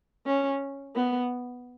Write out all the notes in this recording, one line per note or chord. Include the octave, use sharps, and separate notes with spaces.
C#4
B3